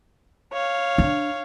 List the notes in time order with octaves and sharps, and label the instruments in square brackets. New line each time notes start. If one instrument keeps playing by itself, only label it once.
[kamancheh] C#5 F5
[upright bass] D4